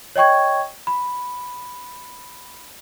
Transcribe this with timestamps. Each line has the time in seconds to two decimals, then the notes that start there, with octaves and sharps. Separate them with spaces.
0.16 C#5 D#5 G5 C#6 G#6
0.87 B5